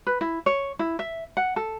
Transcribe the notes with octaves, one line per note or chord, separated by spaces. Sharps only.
B4
E4
C#5
E4
E5
F#5
A4